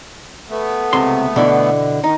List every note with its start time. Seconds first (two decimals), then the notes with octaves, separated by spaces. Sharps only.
0.49 A3 B3
0.93 C#2 C3 C6
1.36 B2 D3 E3
2.04 D#3 D#4